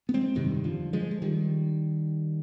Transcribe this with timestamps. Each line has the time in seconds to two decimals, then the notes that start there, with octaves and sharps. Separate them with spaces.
0.09 B3
0.14 G#3 C4
0.35 G1 F2 C3 D#3 G3
0.64 D3 F3
0.93 F3 G#3
1.11 G#3
1.22 D#3 G3